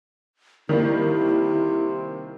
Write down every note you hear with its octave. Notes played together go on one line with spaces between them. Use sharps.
C3 D#3 G3 A#3 E4